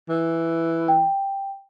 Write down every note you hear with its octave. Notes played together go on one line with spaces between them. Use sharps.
E3
G5